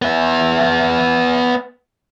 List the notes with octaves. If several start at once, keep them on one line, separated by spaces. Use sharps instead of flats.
B3 E5